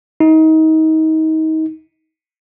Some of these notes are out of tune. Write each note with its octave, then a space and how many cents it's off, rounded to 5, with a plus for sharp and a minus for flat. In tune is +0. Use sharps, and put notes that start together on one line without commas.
D#4 +30